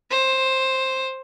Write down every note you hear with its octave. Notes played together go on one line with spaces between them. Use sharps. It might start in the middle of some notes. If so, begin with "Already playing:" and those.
C5